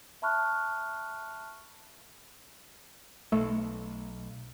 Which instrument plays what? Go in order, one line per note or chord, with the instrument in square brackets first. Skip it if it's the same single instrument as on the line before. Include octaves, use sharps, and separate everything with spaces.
[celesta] E5 A5 B5 C#6 F6 F#6
[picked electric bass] B1 [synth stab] A3